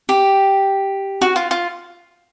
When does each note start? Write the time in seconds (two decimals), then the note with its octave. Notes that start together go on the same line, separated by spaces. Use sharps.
0.09 G4
1.21 F#4
1.36 F4
1.51 F4